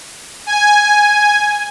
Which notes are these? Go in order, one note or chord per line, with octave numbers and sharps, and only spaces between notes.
G#5